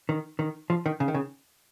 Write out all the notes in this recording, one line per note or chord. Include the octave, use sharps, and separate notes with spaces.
D#3
D#3
F3
D#3
C#3
D#3
C#3